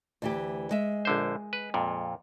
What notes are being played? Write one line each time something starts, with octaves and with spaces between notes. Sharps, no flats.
D2 E3 G4
G#3 E5
A#1 D3 C5
B4
F2 A#2